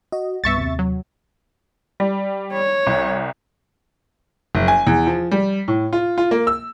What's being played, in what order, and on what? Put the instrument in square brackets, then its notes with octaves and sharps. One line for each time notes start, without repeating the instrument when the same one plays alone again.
[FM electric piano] F#4 D#5
[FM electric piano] C2 G2 B3 [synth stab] E5 C#6 A6
[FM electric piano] D#2 C3
[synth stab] F#3
[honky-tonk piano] G3
[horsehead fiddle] C#5
[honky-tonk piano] C2
[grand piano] F#1
G#5
E2
F3
G3
A2
F4
F4
A#3
E6